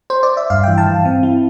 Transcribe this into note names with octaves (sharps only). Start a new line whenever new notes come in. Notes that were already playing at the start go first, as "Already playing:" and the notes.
C5
D5
E5
G2 F5
E3 G5
A5
E3
C4
E4